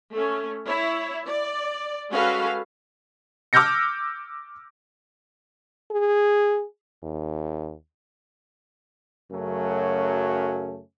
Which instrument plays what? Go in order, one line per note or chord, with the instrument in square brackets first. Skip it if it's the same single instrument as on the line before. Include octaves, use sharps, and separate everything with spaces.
[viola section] A3 C#4 A4
E4 C#5
D5
G#3 C#4 F#4 A4 B4 F5
[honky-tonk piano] D6 E6 F6 G6 A#6 C#7
[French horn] G#4
D#2
[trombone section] F#2 C#3 F#3 A3 C#4